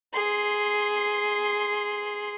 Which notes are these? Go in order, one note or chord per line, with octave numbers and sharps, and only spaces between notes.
G#4 C6